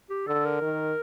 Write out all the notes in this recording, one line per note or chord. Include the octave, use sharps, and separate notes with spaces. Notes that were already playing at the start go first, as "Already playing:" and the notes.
G4
D3 A4
A#4
D#3